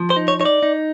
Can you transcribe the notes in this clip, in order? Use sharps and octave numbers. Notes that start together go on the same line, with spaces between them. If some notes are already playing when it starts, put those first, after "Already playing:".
Already playing: F3
C5
D#4
C#5
D#4 C#5
D5
D#4